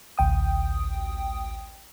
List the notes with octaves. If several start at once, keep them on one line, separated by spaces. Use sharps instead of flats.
A1 D2 G5 D#6